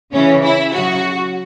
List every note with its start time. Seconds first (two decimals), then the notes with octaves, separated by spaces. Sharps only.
0.12 C#3 E3 C#4
0.44 E4
0.74 C#3 F#3 F#4